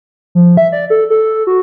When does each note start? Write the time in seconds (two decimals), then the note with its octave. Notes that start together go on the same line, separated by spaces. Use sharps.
0.35 F3
0.57 E5
0.72 D5
0.90 A4
1.10 A4
1.47 F#4